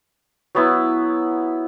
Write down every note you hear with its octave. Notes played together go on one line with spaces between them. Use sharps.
F#3 B3 E4